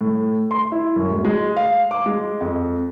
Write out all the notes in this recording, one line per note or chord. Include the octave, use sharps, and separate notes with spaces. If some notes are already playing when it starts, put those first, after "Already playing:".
A2
C6
E4
F#2
D1
G#3
F5
D6
G#3
F2